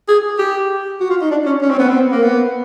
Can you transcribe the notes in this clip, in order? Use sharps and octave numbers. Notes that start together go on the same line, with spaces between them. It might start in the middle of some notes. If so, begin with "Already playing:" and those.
G#4
G4
F#4
F4
D#4
D4
C#4
C#4
C4
B3
C4
A#3
B3